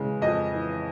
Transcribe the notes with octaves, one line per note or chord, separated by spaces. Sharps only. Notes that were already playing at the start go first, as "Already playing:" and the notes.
Already playing: C#3 E3 G#3
F2 D#5
E3